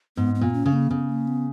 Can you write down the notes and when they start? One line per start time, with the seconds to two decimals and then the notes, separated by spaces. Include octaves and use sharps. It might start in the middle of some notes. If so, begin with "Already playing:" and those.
0.16 G#2 B3
0.35 B3
0.41 A#2
0.54 C#4
0.66 C#3
0.72 A#3
0.90 C#3 B3
1.09 A#3
1.28 B3